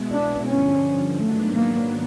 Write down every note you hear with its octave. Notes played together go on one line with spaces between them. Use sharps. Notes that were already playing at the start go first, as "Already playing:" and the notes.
Already playing: B2 G#3 B3 E4
D4
G2 D3 F3 C#4
G#2 D#3 F#3 A3 B3 D4
A#3